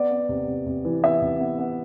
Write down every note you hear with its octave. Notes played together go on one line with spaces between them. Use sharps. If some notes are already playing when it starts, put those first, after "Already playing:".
Already playing: B3 D5
B3
C3
C3
C3
E3
B3 E5
C3
B3
B3